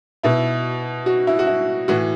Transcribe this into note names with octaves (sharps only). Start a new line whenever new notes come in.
B2 E4
F#4
E4
F#4
E4
A2 E3 F#4